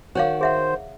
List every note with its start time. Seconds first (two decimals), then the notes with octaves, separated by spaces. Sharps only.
0.15 D#3 F#4 C5 C#5 F5
0.41 G#4 C5 E5 F#5